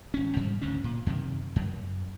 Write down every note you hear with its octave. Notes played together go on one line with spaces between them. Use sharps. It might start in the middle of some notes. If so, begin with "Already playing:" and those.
G#1 C#4
G#2 F3 G3
F#1 D2 G#2 C#4
A#2
F#2 C3 D#3
F#2